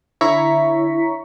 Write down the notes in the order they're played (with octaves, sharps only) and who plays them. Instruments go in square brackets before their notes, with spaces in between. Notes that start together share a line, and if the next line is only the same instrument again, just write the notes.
[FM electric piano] D3 E4 C#5 A#5 C#6 B6